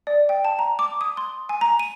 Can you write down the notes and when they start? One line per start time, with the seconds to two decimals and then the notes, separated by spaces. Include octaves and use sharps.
0.07 D5
0.29 G5
0.45 A5
0.59 A#5
0.79 D6
1.01 D#6
1.17 C6
1.49 G#5
1.61 A#5
1.79 D#7